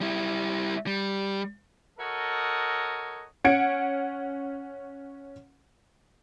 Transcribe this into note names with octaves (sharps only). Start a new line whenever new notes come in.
G3 E4
G3
F#4 A4 A#4 C#5 D#5
C#4 F#5 G#6 C#7 D7